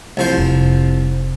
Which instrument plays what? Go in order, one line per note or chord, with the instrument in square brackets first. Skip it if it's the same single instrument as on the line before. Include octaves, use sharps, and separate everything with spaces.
[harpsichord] C2 F3 C5
[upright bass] F1